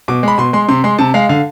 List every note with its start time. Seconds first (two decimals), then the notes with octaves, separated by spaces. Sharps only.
0.08 B2 D6
0.23 G#3 B5
0.38 B2 C6
0.53 G#3 C6
0.69 C3 C6
0.84 G#3 C6
0.99 C3 A5
1.14 G#3 F5
1.29 D3 F5